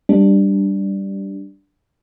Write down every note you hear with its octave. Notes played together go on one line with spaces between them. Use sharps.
G3 D4